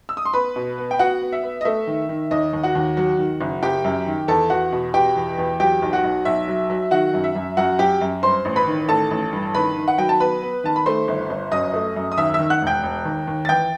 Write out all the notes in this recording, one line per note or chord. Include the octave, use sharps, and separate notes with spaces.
E6
D#6
C6
B3 B4 B5
B2
B3
G5
B3 F#4 F#5
B3
E5
B3
D#5
A3 E5
D#3
D#3
D#2 D#5
D#2
F#4 F#5
D#2
F#3
D#3
F#1
F#1 G4 G5
F#2
D#3
E2 A4 A5
E2 F#4 F#5
B2
B2 G4 G5
E2
E2
F#3 G4 G5
B1
F#4 F#5
B1
B1 E5
F#3
F#3
D#3 F#4 F#5
F#2
E5
F#2
F#2 F#4 F#5
F#3 G4 G5
F#2
G2 C5 C6
A1
B4 B5
D#3
A1 A4 A5
A1
G2
D#3 B4 B5
D#3
F#5
F#3 G5
A5
B3 B4 B5
B3
D#3 A5
B5
A3 C5 C6
G1
G1
F#2 D#5 D#6
A3
F#2
D#6
D#2 E5 E6
E5 E6
D#3
F#5 F#6
E1
G5 G6
E1
D#2
D#2
A6
E3 G5 G6